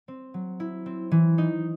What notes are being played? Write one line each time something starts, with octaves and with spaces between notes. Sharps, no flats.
C4
F#3
E4
C4
E3
D#4